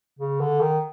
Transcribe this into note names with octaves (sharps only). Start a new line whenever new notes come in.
C#3
D3
D#3